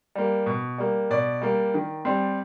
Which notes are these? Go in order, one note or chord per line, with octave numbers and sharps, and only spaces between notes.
G3 A#3
B2
G3 A#3
B2 D5
G3 A#3
D#3
G3 C4